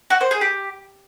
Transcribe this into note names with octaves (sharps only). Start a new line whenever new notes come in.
F#4
C5
G#4
G4